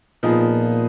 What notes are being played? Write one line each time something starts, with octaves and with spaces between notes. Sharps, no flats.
A#2 F3 B3 D#4 G#4